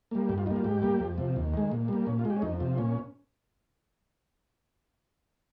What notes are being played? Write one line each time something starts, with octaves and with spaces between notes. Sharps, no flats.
G3 A#3
G2 G4
F4
G3 A#3 D#4
F4
G#2 G4
G3 A#3
F2
C3 F3
D#2
D#3 G#3
A#2
G3 A#3
A#2 C#4
F4
G#3
G4
C#4
F2 D#4
C3 F3
A#2 C#4